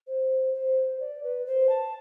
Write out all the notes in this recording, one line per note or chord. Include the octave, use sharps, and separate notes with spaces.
C5
C5
D5
B4
C5
A5